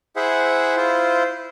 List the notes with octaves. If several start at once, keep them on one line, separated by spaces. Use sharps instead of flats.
E4 G#4 C5 E5 F#5
E4 F4 C5